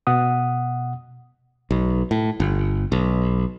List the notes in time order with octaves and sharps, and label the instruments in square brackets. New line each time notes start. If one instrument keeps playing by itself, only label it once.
[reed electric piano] B2 F#5 D#6
[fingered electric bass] B1
A2
G1
B1